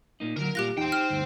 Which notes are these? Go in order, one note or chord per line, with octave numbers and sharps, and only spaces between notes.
A#2 A#3 D#4
D3 F3 F#3 A#4
A#2 G3 F4 G4 F#6 A#6
E2 D#4 C5 G5
G4 F6
D2 G2